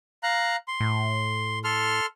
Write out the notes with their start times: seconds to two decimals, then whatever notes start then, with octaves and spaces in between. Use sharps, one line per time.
0.23 F5 A#5 F#6
0.68 C6
0.80 A2
1.64 A4 C6 F6